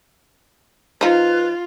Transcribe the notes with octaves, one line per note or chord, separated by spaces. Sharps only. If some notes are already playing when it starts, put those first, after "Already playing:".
F3 D#4 F4 B4